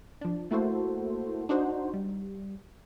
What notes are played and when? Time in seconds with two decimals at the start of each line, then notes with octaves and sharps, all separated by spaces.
0.21 F3 D4
0.51 A3 A#3 E4 F#4 A4 C5
1.49 D4 D#4 F#4 C5
1.94 G3